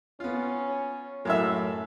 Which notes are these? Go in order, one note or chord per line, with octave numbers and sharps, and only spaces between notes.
B3 C#4 F4
F#2 A2 A4 E5